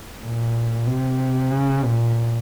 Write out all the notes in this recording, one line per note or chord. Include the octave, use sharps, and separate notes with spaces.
A#2
C3
C#3
A#2